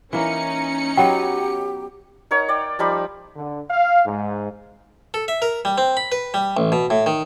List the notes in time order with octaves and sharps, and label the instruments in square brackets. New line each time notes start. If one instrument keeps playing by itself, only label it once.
[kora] E3 A#3 [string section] C#4 D#4 C#7
[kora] F#3 B3 D#5 [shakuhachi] G4 [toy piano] G5
[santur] D#4 A#4 C#5 F#5
D5 G5
F3 G3 D#4 B5
[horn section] D3
F5
G#2
[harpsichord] A4
E5
A#4
G3
C4
B5
B4
G3
A1
B2
A2
D#3